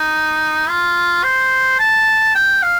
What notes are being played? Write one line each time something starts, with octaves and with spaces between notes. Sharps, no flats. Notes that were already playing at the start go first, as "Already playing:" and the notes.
Already playing: D#4
F4
C5
A5
G5
F5